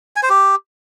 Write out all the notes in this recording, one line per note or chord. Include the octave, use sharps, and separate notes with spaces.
G#5
C5
G4